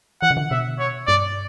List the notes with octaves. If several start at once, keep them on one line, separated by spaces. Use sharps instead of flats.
E3 F#5
C#3
D3
B2 E5
C#5
G2 D5